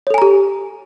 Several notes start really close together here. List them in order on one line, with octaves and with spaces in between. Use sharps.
C#5 A4 G#5 A#5 G4